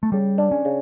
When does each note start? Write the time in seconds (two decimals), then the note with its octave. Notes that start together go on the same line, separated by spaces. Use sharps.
0.03 A3
0.12 C#3 G3
0.38 D4
0.51 C#4
0.65 C#3